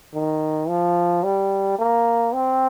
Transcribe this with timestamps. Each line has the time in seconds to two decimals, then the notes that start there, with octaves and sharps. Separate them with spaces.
0.14 D#3
0.69 F3
1.23 G3
1.79 A#3
2.34 C4